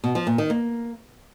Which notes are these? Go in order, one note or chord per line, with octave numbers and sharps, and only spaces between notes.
B2
F3
A#2
D#3
A#3